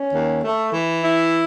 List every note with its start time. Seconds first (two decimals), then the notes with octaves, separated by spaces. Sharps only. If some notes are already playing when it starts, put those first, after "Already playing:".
Already playing: C#4
0.14 D#2
0.43 A3
0.72 E3
1.02 E4